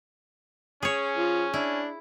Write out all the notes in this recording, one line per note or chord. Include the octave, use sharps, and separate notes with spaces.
C#4 G#4 C#5
F3
D4 E4